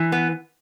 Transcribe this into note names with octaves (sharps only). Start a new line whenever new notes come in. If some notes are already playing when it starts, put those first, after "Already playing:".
Already playing: E3
B3